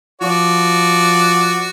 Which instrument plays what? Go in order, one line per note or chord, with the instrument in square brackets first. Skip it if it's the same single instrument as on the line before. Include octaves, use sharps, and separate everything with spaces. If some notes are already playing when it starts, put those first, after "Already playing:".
[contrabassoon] F3 [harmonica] F#4 D5